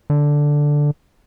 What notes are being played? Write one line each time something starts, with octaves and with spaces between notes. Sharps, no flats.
D3